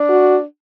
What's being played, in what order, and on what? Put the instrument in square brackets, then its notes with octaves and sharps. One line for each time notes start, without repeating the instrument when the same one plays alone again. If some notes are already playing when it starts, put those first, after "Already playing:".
Already playing: [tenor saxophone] D4
[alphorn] F#4